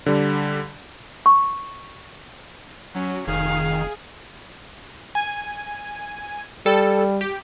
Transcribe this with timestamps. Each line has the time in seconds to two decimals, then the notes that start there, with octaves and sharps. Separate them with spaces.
0.06 D3 G3
1.26 C#6
2.94 F#3 C#4
3.27 F1 D#3 G#4 F5
5.15 G#5
6.66 G3 A4
7.21 G4